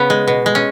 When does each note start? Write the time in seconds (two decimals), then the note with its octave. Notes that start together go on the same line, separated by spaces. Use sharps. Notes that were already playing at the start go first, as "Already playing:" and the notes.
Already playing: C#3 B3
0.10 G#3
0.28 B2
0.46 G#3
0.55 C#4